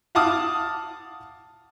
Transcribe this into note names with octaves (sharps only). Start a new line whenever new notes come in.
F5 F#5 A5 D6 D#6 F6